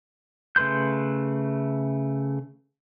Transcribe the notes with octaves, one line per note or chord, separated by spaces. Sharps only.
C#3 A3 B4 C6 G6